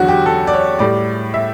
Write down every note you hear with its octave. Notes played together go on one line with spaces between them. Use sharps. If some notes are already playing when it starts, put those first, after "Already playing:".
Already playing: E2 D3 F#3 F#4
G4
A4
D5
C#5
A2 G3 D5
E5